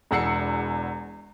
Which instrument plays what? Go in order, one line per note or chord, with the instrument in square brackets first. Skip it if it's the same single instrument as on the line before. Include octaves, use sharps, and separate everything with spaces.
[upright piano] E1 E2 F#5 E6 C7 C#7